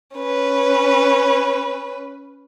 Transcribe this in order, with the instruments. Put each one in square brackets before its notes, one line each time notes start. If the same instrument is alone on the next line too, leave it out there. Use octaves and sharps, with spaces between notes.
[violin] C#4 B4